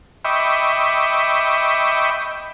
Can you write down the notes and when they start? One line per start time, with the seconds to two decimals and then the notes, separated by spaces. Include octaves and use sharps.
0.25 D#5 E5 G5 B5 C#6 D6